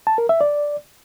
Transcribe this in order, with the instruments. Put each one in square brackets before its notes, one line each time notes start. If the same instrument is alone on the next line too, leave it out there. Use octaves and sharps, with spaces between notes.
[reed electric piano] A5
A#4
E5
D5